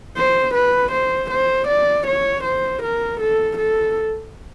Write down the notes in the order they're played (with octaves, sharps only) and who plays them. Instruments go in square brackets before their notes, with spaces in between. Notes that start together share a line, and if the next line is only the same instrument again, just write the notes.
[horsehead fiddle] C5
B4
C5
C5
D5
C#5
C5
A#4
A4
A4